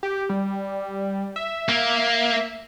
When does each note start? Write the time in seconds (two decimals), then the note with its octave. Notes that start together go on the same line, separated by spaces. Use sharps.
0.03 G4
0.29 G3
1.36 E5
1.69 A#3